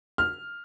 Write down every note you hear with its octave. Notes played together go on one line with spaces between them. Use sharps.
F6